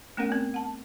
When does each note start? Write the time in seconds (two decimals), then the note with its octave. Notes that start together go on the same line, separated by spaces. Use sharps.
0.17 A3 B3 C#4 A#4 F#5
0.29 B3 C4
0.54 F#5 A5